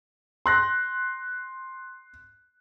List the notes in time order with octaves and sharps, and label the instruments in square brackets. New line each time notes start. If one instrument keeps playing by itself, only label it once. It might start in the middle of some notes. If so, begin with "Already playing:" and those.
[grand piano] C6 F#6 A#6